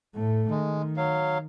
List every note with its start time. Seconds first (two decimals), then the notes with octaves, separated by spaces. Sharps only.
0.15 A2 A3
0.51 D#3 G#3
0.97 F#3 F5